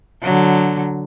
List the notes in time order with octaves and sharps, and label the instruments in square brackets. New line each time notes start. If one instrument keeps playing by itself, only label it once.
[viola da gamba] D3 F#3